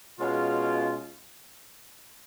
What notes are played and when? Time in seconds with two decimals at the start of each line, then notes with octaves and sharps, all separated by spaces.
0.20 B2 G#3 C#4 F4